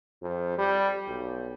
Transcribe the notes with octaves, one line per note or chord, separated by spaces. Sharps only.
F2
G3
B1